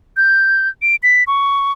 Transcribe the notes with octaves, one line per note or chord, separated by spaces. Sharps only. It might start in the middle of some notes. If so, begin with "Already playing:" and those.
G6
D7
B6
C#6